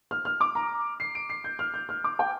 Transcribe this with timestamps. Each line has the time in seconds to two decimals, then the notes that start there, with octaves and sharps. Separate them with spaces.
0.11 F6
0.25 F6
0.41 D6
0.55 A#5
1.00 C7
1.15 D7
1.30 C7
1.44 G6
1.59 F6
1.74 G6
1.89 F6
2.04 D6
2.19 G5